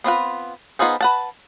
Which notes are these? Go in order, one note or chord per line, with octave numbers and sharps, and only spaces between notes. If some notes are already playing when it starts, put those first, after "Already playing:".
B3 C4 F4 B4
B3 D#4 F4 G#4 C5
B4 F#5 A5